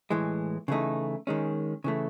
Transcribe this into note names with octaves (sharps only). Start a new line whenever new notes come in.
A2 E3 G#3
C#3 E3 A3 D#4
D#3 G#3 C#4
C#3 E3 A3